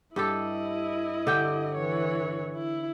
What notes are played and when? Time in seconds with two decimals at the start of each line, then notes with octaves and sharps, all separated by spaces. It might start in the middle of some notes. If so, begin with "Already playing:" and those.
0.16 G2 E4 G4 A4 D#5
1.27 D3 G4 G5
1.75 E3 C#5
2.56 E4